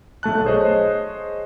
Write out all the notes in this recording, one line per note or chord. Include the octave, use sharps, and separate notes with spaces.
B1 A3 A5 F#6
G#4 C5 C#5 D#5